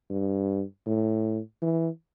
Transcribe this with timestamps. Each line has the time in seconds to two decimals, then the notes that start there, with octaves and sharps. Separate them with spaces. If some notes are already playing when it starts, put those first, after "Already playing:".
0.10 G2
0.87 A2
1.62 E3